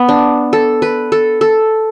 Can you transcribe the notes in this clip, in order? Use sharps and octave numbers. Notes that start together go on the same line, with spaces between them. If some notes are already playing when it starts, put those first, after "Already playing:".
Already playing: B3
D4
A4
B4
A4
A4